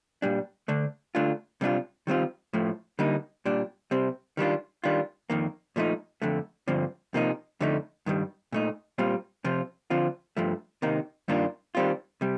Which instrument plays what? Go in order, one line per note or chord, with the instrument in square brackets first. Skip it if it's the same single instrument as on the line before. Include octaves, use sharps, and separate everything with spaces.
[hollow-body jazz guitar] A#2 G3 D4
D3 A3 D4
D3 A3 D4 F4
C3 G3 D4 F4
D#3 G3 C4 F4
A2 F3 A3
D3 G3 A#3 D#4
A#2 G3 D4
C3 G3 C4
D#3 G3 D4 F4
D#3 G3 D4 F4
F2 D#3 A#3
A#2 F3 A3 D#4
F2 D3 A3
G2 D3 F3 C4
C3 F3 A#3 D#4
F2 D3 A3 D#4
G2 D#3 G3
A#2 A3 D#4
A#2 G3 C4 F4
C3 F3 C4 F4
D3 F3 C4 F4
G2 F3 A3
C3 D#3 A#3 D#4
G2 D#3 A#3 D4 F4
D#3 G3 C4 F4
C3 G3